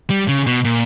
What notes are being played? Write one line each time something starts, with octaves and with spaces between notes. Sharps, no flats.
G3
C#3
B2
A#2